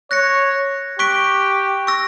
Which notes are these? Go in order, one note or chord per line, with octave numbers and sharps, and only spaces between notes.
C#5 F#6 A#6 C#7
G4 C#6 F#6 B6 D7 G7
C#6 E6 A#6